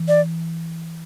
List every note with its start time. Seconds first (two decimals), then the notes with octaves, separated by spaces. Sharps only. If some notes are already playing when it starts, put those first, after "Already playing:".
Already playing: E3
0.08 D5